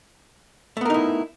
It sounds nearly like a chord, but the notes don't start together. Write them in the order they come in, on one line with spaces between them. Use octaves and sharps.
A3 B3 A#4 D#4 E4